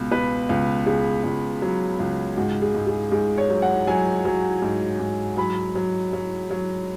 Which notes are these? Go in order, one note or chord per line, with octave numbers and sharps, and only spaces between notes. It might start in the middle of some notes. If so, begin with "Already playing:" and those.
Already playing: C#2 B2
B2 B4
C#2
C#2 G#4
C#2
F#3
C#2
G#2 F#4
G#4
G#2
G#4
G#2 G#4
C#5
F#3
F#5
F#3 G#5
F#3
G#2
G#2
F#3 B5
F#3
F#3
F#3